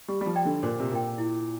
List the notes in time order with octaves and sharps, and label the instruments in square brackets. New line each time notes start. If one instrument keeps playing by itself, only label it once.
[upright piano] G3 [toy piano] G4
[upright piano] G3
F3
[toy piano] D5 G5 A#5
[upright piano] D3
[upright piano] A#2 [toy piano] C5
[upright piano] C3
[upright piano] A#2 [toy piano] G5 A#5
[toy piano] E4